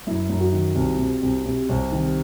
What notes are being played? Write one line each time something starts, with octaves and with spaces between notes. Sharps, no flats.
F#2 E4
F#2
F#4
D#3
C2
C3
C2
C3
C2
D#3